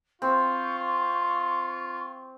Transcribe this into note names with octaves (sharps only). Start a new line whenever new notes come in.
C4 F4 C#6